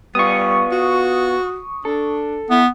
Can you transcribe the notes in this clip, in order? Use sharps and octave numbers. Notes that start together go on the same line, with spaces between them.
G3 B3 F4 C#6 D#6
F#4
D4 A4
B3 E4